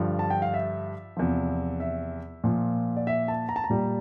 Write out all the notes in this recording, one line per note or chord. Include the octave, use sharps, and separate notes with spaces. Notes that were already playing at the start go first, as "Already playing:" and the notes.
Already playing: G2 D3 F3
A5
G5
F5
E5
E2 C3 F3
E5
A#2 F3
D5
E5
A5
A#5
A5
A#5
A#2 G3